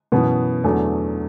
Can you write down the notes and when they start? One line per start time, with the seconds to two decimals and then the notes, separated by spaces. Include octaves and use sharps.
0.12 F#2 B2 E3 B3
0.64 E2 D3 F#3 A3